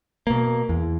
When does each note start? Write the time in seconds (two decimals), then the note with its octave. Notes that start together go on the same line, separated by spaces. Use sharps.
0.27 B2 A#3
0.69 E2